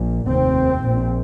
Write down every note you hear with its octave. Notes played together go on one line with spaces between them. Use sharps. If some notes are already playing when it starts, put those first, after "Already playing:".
Already playing: A#1 A#2
F1 D#2 C4
A#1 A#2